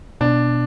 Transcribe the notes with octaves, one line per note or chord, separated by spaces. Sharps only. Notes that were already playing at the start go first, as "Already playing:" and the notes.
B2 D4